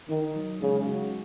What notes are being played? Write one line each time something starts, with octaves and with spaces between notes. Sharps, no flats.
D#3 D#4
F#3
C#3 G#3
F#4